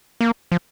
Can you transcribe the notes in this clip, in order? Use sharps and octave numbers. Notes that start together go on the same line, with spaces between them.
A#3
F3